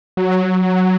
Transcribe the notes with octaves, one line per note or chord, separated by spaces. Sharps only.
F#3